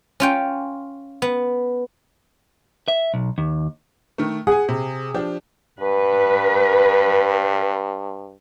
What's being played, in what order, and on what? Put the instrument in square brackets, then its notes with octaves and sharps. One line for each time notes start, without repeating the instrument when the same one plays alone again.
[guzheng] C#4 F4 G5
B3
[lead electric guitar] E5
B1
D#2
[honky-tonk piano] D#3 A3
[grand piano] G#4 [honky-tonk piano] F#5 G#5
[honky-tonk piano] C3
F3 D4 G4
[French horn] G2 [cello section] B4